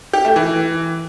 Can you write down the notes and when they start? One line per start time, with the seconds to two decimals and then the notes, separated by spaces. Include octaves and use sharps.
0.13 G4
0.25 A3
0.36 E3